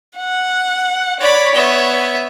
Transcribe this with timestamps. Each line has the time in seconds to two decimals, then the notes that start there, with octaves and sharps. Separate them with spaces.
0.17 F#5
1.20 C#5 D5 B5
1.54 B3 E5